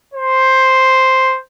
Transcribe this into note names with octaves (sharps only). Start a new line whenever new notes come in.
C5